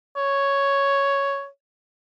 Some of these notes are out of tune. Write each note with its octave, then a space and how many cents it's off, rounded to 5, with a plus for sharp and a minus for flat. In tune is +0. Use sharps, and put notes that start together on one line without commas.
C#5 +5